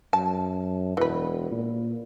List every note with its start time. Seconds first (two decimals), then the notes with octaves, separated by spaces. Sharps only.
0.13 F#2 A5
0.97 E1 E3 B4
1.51 A#2